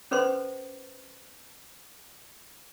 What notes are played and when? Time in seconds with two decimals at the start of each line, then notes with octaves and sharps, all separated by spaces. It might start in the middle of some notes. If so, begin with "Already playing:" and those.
0.11 C#4 A4 B4 C5 C6